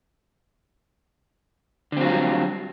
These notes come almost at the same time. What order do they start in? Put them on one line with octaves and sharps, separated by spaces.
D3 C4 F#3 F4 G3